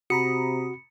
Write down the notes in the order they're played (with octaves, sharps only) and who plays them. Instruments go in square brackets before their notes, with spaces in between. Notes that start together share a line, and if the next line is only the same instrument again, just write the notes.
[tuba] C3 [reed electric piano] F#4 [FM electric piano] A#5 B5 D#6 [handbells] C#7